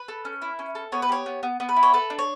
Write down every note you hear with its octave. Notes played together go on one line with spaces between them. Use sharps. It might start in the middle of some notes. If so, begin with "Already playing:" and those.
Already playing: B4
A4
C#4
E4
C#4
A4
B3 C#5
B4
G4 C#5
B3
B3
B3
B4
E4
C#5
A4 B4
D4
C#5